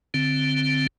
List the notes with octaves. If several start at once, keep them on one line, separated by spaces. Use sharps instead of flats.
D3 C4